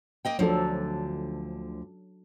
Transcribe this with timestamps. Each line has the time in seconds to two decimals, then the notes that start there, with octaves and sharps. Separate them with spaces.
0.25 A#3 D#5 G5
0.39 D2 D3 F3 F#3 D4 A4